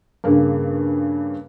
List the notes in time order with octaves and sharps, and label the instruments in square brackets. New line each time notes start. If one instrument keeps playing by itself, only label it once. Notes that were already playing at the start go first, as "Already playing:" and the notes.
[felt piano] G2 C#3 A#3